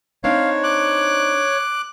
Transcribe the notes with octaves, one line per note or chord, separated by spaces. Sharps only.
C4 D4 D#4 C#5 F5
D6 F#6